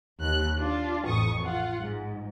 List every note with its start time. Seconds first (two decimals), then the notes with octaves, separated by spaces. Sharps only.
0.19 D#2 F#6
0.57 D4 F4
1.05 A1 F2 C#6 D#6
1.42 F4 F#5
1.79 G#2